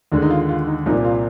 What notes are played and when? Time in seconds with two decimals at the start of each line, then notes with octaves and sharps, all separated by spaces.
0.12 D#2 D3 G#3
0.22 D#4
0.30 F4
0.49 F4
0.67 D#4
0.86 C2 A#2 F3 A#3 D#4
1.05 F4